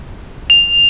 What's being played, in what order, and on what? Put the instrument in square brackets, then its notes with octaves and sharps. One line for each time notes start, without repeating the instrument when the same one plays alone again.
[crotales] F7